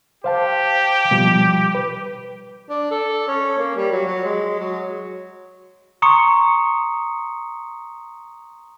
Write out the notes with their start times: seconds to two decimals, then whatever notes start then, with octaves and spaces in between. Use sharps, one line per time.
0.24 G4 C5 F5 A5
1.11 B2 F3 G3
1.75 B4
2.69 D4
2.91 A4
3.28 C#4
3.58 A#3
3.76 G3
3.92 F#3
4.07 F#3
4.25 G#3
4.59 F#3
6.02 A#5 C6 C#6 D#6 C#7